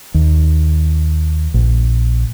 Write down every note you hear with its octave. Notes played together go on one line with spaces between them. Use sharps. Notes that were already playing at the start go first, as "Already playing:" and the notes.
D#2
A#1